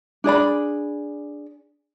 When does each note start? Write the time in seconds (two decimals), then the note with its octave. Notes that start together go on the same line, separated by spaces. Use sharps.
0.24 D4 G#4 D5 B5